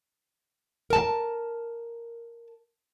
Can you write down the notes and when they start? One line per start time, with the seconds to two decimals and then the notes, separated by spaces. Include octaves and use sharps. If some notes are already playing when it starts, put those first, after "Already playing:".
0.90 A#4 A5